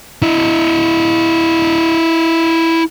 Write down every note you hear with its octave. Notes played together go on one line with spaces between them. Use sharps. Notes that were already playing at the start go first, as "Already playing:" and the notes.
E4 D#5